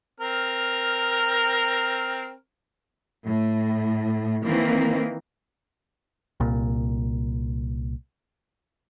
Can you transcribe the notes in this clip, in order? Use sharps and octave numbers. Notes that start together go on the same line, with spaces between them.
C4 A#4 F6
A2
D#3 E3 A#3 C4
C2 A#2